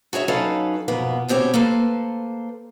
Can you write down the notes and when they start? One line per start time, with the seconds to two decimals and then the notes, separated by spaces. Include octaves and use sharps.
0.13 F#4 G#4 C#5 E5
0.28 F#3 C#4 D#4 A4 B4 F5
0.88 F2 G#2 B2 A#3 B3
1.28 D2 B2 C4 G4 C#5
1.54 A#3 A4 B4 C5